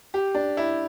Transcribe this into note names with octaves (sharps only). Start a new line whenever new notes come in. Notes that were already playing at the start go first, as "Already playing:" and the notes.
G4
D4
E4